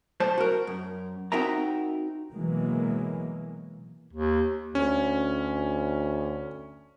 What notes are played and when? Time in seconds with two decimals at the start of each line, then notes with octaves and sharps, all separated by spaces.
0.20 B1 A3 C5 A5
0.38 F#4 A#4
0.67 F#2
1.32 C4 D#4 F#4 A#4 E5 A#5
2.32 B2 E3 F#3 G#3 A#3
4.13 D#2
4.75 D2 C#4